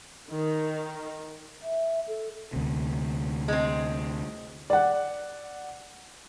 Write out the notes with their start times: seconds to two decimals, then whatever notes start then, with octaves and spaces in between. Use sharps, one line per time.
0.31 D#3
1.63 E5
2.08 A4
2.53 D2 C3
3.48 G#3 C4
4.70 D5 F#5